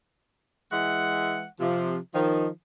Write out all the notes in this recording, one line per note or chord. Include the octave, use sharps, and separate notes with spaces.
E3 G#3 E5 F#5
C3 F3
D#3 F3